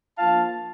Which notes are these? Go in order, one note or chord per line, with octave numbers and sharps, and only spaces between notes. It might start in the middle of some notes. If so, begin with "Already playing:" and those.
F3 A#3 D4 F4 F5 A5